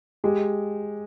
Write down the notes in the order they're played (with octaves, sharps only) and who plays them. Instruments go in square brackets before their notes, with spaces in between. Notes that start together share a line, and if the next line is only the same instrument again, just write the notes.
[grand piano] G#3 [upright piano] G4